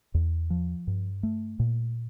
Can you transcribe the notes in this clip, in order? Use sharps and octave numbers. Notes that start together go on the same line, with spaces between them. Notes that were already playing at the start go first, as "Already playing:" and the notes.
E2
F3
G2
A3
A#2